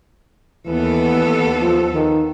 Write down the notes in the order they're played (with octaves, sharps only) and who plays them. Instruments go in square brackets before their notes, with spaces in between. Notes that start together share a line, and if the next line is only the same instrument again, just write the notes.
[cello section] D#2 B3 A4 [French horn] E3
[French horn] F3
D#3